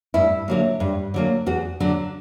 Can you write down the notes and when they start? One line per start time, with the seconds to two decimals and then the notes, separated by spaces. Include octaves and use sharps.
0.14 G2 E4
0.48 D3 F#3 A#3
0.80 G2
1.14 D3 F#3 A#3
1.46 E2 F#4
1.80 D3 F#3 D4